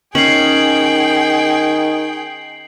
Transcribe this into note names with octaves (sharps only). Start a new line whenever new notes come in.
D#3 C#4 G#4 G5 C7 C#7 F#7